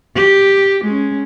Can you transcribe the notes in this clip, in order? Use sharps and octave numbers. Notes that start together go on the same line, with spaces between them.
G4
G#3 C#4